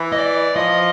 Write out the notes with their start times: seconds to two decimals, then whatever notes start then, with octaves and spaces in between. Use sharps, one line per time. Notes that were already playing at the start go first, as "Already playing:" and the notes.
Already playing: E3
0.12 D#5
0.18 D5
0.56 F3 D#5